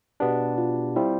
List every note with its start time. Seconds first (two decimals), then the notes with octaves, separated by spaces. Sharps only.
0.20 B2 B3 D4 G4
0.58 F4
0.96 G3 C4 E4 F4